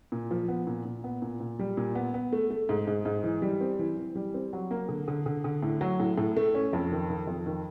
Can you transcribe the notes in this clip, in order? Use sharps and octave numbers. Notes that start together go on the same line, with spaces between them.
A#2
F3
B3
A#2
A#2
B3
A#2
A#2
G3
A#2
B3
B3
A3
A3
G#2
G#2
G#2
E3
G3
C4
E3
E3
G3
C4
F#3
A#3
D3
D3
D3
D3
A2
F#3
A2
A2
A3
C#4
F2
D#3
D#3
F2
D#3